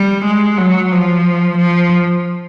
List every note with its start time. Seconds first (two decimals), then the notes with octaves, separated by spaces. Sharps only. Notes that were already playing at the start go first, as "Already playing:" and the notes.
Already playing: G3
0.24 G#3
0.58 F#3
0.91 F3
1.57 F3